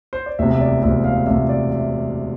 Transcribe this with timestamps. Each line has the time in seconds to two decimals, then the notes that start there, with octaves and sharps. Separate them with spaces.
0.13 C5
0.26 D5
0.39 E1 D2 C3 E5
0.55 E5
0.61 D5
0.83 E1 D2 C3 E5
1.05 F5
1.27 E1 D2 C3 E5
1.49 D5
1.71 E5